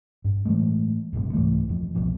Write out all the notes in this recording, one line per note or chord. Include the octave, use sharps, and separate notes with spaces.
G2
A2 E3 G#3 A3
F1 B1 G2 C3
C2 G#2 E3 A3
D#1 F2
C2 F2 B2 F3